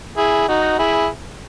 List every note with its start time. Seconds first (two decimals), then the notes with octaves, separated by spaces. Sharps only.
0.17 E4 G#4
0.48 D#4 F#4
0.79 E4 G#4